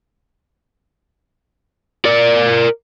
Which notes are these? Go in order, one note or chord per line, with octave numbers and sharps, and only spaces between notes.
A#4 D5